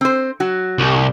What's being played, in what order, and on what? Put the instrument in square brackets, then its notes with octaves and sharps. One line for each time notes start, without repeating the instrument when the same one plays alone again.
[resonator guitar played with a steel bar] C4 C5
F#3 F#4
[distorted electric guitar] C2